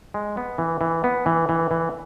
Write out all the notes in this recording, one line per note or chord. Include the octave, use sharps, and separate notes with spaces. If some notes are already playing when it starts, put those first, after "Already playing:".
G#3
B3
E3
E3
B3
E3
E3
E3